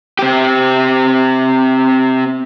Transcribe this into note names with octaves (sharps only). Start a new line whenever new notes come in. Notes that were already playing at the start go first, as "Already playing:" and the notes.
C4 G4